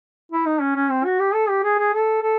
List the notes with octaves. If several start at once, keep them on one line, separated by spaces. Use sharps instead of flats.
E4
D#4
C#4
C#4
C4
F#4
G4
A4
G4
G#4
G#4
A4
A4